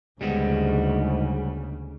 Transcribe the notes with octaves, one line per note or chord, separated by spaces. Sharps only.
D2 G#2 C#3 G3 G#3 B3